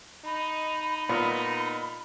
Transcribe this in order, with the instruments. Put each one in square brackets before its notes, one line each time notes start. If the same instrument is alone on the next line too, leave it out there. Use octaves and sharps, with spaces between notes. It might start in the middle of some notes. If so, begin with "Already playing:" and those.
[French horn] D#4 [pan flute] B5
[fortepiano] A#2 B3